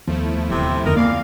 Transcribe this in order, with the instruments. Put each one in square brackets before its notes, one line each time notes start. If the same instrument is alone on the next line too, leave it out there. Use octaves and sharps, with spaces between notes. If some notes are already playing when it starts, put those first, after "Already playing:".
[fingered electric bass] D#2 B3 [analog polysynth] F3 A3 E4
[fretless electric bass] D1 [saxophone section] C3
[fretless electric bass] F2 D3 [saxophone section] D#4 A4 A#4
[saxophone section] E2 D5 F5 [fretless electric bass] A#3